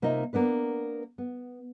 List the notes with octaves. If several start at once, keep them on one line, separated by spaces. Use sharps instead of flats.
C3 A#3 D#4 F4 D#5 E5
A#3 B3 D4 B4
B3